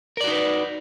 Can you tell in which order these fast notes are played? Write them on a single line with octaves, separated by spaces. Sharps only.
A#4 D5 F#4 D#4 B4